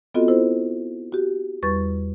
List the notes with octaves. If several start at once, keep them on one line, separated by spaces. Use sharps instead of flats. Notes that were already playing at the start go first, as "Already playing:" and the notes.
B3 C4 F4 F#4 A4 D#5
E4 A4 C5
F#4 G4
E2 G3 B4 C#6 A6